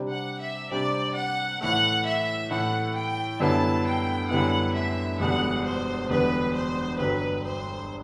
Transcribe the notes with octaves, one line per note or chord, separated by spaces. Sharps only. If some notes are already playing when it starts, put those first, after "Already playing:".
Already playing: C3 G3 D4 G4 C5
F#5
E5
C3 G3 D4 G4 C5 D5
F#5
A2 E3 A3 F#5
E5
A2 E3 A3 F#5
G5
F#2 D3 G3 B3 E4 A5
G5
F#2 D3 G3 B3 E4 F#5
E5
E1 E2 D3 G3 B3 F#5
C5
E1 E2 D3 G3 B3 B4
C5
G1 G2 D3 F#3 B4
C5